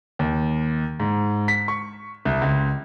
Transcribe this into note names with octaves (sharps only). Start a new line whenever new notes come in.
D#2
G#2
B6
C#6
C2
C#2